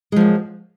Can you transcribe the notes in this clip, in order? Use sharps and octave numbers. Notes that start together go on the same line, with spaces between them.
F#2 F3 G#3